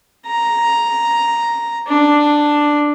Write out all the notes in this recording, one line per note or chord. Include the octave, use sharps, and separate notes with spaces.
A#5
D4